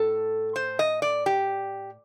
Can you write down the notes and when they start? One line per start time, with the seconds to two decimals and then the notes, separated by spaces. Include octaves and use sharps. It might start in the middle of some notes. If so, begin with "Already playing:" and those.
Already playing: A2 A4
0.56 C5
0.79 D#5
1.02 D5
1.26 G4